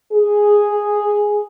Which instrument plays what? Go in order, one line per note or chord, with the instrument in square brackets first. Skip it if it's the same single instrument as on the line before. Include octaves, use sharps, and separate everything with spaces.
[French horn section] G#4